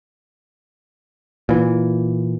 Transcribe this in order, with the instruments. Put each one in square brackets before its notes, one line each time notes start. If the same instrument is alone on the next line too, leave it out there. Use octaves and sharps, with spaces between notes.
[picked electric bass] A#2 E3